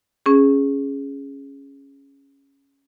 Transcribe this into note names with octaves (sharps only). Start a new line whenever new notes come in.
C#4 G#4